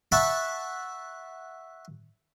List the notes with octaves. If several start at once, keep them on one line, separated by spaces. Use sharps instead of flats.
E5 F#5 A5 B5 C#6